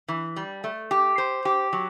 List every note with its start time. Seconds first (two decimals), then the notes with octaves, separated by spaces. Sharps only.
0.08 E3
0.36 G3
0.64 A3
0.91 G4
1.18 C5
1.45 G4
1.73 F#3